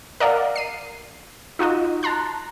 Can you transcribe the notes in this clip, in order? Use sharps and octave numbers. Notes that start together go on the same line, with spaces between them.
A#4 D5 D#5 F5 F#5
C7 D#7
D#4 F4 F#4 D#5
A5 A#5 C6 F#6